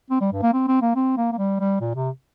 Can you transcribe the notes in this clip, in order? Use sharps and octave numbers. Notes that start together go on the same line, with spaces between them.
C4
G3
G2
A#3
C4
C4
A#3
C4
A#3
A#3
G3
G3
A#2
C3